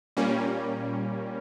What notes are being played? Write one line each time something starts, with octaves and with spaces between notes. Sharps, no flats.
A#2 G3 A#3 C#4